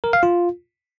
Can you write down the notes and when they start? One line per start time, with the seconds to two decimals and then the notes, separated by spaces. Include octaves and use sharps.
0.04 A#4
0.13 F5
0.23 F4